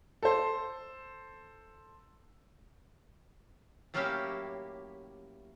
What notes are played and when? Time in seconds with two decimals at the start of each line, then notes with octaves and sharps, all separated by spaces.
0.23 A4 C5
3.94 A2 F#3 A#3 C#4 E4 G4